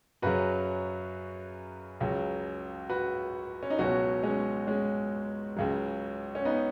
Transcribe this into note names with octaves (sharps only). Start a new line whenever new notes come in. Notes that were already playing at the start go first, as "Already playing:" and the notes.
F#2 C#3 F#3 F#4 B4
C#2 C#3 F#3
F#4 B4
C#4
D#4
C#2 B2 F#3 C#4 F#4
G#3 C#4
G#3 C#4
C#2 C#3 F#3
C#4
B3 D#4